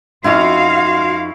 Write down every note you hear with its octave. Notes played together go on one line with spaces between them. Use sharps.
F2 C#4 D#4 E4 F#4 F5 F#5 C6